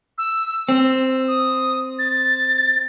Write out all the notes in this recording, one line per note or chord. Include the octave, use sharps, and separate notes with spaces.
E6
C4 E6
D#6
A6